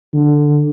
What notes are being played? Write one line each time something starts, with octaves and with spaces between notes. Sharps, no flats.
D3